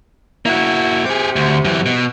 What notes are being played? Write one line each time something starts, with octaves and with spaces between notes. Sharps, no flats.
A#3 E4 F#4
C3 G4 G#4
D2
F#2 E3
B2